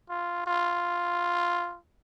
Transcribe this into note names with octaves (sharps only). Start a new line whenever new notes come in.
F4
F4